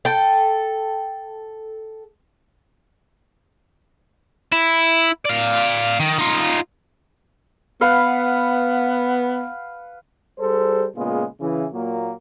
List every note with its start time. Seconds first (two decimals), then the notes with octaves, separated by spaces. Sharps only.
0.05 A4 G5
4.52 E4
5.25 D5 F5
6.00 D#3
6.19 D#4 F4
7.81 B3 B4 F5 F#5
10.39 G3 G#4 A4 C5
10.95 A#2 C#3 G#3 B3 F4
11.41 C#3 E3
11.72 A#2 F#3 A#3